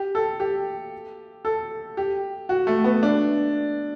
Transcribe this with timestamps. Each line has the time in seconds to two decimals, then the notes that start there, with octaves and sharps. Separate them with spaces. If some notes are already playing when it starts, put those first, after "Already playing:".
Already playing: G4
0.15 A4
0.40 G4
1.45 A4
1.97 G4
2.49 F#4
2.67 A3
2.84 B3
3.03 D4